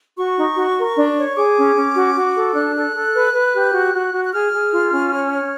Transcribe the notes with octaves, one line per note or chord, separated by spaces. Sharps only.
F#4 C#6
D#4
F#4
A#4
D4
C#5
G#4 D6
C#4
C#4
F#4
F#4
A4
D4 F#6
A4
A4
B4
B4
G4
F#4
F#4
F#4
F#6
G#4 F6
G#4
F4
C#4
C#5
C#5